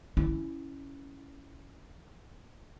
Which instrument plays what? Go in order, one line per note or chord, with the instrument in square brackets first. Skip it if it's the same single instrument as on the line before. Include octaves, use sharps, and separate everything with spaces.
[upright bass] C#4 E4